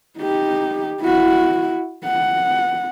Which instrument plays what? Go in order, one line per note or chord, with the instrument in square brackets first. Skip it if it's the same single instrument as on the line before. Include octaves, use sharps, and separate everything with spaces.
[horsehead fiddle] D#4 G4
E4 F#4
F#5